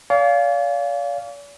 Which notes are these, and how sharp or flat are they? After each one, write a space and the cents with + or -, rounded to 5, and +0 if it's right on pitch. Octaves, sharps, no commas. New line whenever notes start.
D5 -45 F5 +0 G#5 +0